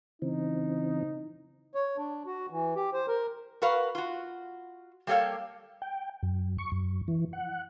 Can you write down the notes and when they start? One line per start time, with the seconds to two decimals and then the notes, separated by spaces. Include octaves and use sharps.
0.22 C#3 E3 C4 D#4
1.75 C#5
1.97 D4
2.26 F#4
2.50 E3
2.76 G4
2.93 C5
3.08 A#4
3.62 F#4 A#4 B4 F5
3.95 F4 F#4
5.07 G3 A#3 G4 A4 C#5 F5
5.82 G5
6.23 F#2
6.58 C#6
6.72 F#2
7.08 E3
7.33 F#5